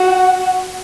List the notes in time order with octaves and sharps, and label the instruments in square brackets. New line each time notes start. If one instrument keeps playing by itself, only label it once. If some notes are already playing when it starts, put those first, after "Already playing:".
Already playing: [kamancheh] F#4 [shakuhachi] F#5